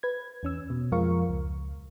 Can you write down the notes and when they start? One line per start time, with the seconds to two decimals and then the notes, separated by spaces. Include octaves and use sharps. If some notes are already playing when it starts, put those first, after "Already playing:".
0.03 B4 G#6
0.43 E2 C#4 E6
0.70 B2
0.92 F2 F3 G#3 A#4 F5 C#6
1.29 C#2